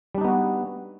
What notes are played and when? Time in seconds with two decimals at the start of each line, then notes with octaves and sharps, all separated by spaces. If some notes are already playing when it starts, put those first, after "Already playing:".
0.15 G3
0.18 D4
0.21 D#4
0.25 B3
0.28 F#4